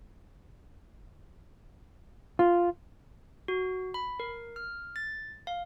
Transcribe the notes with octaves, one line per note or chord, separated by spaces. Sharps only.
F4
F#4
B5
A#4
F6
A6
F5